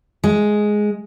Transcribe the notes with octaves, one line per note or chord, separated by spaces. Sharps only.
G#3